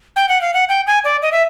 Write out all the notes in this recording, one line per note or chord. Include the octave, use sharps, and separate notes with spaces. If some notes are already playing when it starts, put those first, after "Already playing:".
G5
F#5
F5
F#5
G5
G#5
D5
D#5
E5